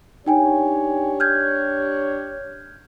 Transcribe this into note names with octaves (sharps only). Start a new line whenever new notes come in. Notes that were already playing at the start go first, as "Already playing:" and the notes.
D4 D#4 G4 C#5 G5 G#5
F6 G6 G#6